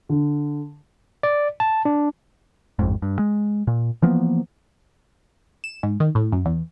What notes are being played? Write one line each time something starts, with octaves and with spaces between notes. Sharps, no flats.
D3
D5
A5
D4
A1 F2 G#2
G2
G#3
A#2
E3 F3 A#3 B3
E7
G#2
D#3
A2
F#2
E2